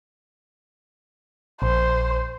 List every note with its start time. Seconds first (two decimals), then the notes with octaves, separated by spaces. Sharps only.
1.62 A#1 C5